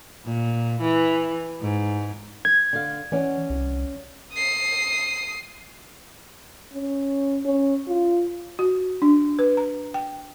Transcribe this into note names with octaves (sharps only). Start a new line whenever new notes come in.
A#2
E3
G#2
G#6
D3 F5
E3 C#4 D5 F#5
C2
D#6 C7
C#4
C#4
F4
F#4
D4
B4
A#5
G5